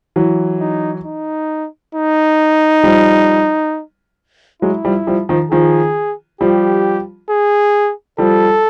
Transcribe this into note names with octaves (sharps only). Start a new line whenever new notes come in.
E3 F#3
D#4
D#4
D#4
F3 G3
F#3 G#3 E4
F3 G3
F3 G3
D#3 F3
D#3 F3 G#4
F3 G3 G4
G#4
F3 G3 A4